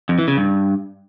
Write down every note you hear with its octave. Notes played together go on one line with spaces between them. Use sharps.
F2
E3
C#3
G2